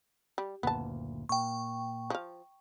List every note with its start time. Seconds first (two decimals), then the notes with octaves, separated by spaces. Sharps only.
0.38 G3
0.63 F#1 D2 A#2 B3 A5
1.29 A#2 G5 C#6
2.10 F3 F5